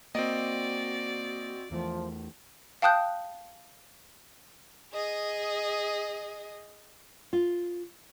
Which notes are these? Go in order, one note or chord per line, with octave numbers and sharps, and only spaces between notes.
A#3 C4 F#4 D5 D#5
E2 E3 F3 A3
F5 G5 A5 D#6 F#6 G6
G#4 D#5
F4